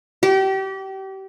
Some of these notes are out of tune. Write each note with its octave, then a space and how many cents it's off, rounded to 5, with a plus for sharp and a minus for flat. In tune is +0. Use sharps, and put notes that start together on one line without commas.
G4 -30